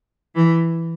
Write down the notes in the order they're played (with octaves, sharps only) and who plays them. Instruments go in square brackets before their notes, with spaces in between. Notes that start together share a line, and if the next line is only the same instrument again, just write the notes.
[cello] E3